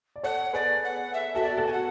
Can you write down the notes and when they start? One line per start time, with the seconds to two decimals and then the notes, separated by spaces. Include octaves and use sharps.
0.16 D5
0.23 A4 C#5 F#5
0.53 G#4 B4 D5
0.84 F#5
1.14 E5
1.35 F#4 A4 E5
1.43 D5
1.57 F#4 A4
1.67 G#5
1.73 F#5